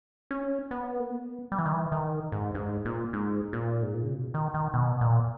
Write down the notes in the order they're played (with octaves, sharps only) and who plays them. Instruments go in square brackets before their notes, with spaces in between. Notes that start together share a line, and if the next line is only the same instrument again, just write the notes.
[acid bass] C#4
B3
A#3
B3
G3
E3
D#3
E3
D#3
G#2
G2
G#2
A#2
G#2
A#2
G#2
A#2
C#3
B2
D#3
D#3
B2
A#2